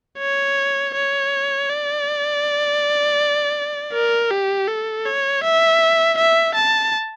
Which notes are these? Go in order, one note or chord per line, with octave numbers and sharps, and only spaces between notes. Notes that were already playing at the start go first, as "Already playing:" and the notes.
C#5
C#5
D5
A#4
G4
A4
C#5
E5
E5
A5